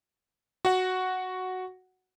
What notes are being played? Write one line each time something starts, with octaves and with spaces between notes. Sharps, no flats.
F#4 F#5